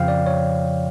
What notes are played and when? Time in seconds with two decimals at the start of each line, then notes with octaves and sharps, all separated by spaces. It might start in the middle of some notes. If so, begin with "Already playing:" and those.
Already playing: F2 C#3 F3 F5 G5
0.08 D5
0.26 C#5